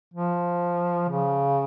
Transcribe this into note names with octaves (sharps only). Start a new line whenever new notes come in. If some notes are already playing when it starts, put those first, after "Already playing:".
F3
C#3